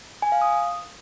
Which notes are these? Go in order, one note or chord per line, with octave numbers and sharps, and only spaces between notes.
G#5
F5
D#6